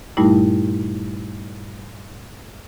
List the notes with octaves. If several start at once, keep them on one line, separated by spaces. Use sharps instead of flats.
G2 A#2 G3 A3 D#4 E4